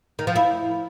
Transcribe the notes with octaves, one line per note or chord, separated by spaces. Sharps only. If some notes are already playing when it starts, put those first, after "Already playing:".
D#3
F3
E4